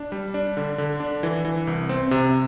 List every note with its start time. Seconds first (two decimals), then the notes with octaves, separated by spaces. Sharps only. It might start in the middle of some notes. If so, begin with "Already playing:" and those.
Already playing: D4
0.12 G3
0.34 D4
0.57 D3
0.78 D3
1.00 D4
1.23 E3
1.45 E3
1.67 C2
1.89 C4
2.11 C3